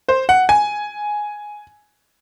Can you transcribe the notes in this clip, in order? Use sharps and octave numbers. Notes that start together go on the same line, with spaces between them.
C5
F#5
G#5